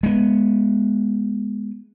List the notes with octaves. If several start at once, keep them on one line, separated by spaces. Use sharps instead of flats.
G#3 B3